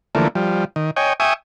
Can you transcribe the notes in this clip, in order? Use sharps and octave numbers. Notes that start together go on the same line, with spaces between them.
D3 E3 F3 A3 A#3
F3 G3
D#3
C#5 D#5 G5 G#5
E5 G5 G#5 C#6 D#6